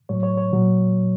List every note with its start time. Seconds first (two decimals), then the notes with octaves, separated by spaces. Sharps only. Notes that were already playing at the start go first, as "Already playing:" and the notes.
0.09 A2 F#3 C#5
0.23 C#5
0.37 C#5
0.52 A#2 F#3